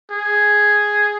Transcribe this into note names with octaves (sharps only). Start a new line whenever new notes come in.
G#4